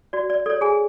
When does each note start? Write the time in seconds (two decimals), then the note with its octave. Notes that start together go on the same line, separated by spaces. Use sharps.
0.13 F#4 D5
0.30 D5
0.46 A4 C#5 D5
0.61 G#4 G#5